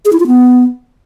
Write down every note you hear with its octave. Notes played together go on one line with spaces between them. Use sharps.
G#4
E4
F4
B3